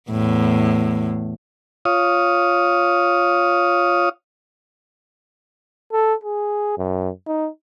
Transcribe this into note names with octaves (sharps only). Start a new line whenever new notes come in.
E2 A2
F4 C#5 F5 D#6
A4
G#4
F#2
D#4